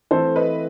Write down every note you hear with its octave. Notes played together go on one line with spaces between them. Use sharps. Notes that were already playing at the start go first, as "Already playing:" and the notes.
E3 A3 C4 A4 C5
B4 D#5